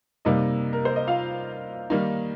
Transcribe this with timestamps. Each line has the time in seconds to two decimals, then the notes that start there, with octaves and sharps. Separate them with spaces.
0.25 C3 G3 A#3 D#4 D#5
0.73 A#4
0.85 C5
0.96 D#5
1.07 F4 F5
1.90 D#3 G3 A#3 D#4